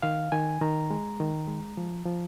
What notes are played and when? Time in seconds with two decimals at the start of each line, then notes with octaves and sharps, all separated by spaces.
0.02 D#3 F5
0.32 D#3 G#5
0.61 D#3 A#5
0.91 G#3
1.20 D#3
1.48 G#3
1.77 F3
2.06 F3